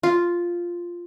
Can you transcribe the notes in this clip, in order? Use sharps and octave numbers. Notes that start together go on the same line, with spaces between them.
F4